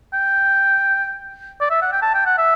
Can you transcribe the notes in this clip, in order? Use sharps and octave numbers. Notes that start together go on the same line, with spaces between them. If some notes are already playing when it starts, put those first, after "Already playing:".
G5
D5
E5
F#5
G5
A5
G5
F#5
E5